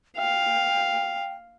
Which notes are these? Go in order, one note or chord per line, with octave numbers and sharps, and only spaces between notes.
F5 G5